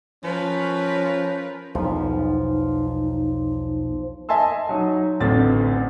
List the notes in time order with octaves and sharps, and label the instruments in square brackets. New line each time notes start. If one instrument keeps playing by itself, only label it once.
[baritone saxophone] F3 [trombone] C#4 [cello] A#4 B4
[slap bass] B1 E2 [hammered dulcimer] F3 [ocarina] D#4
[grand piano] D#5 E5 G#5 A5 C6 E6
F#3 D#4
A1 D2 C4 A6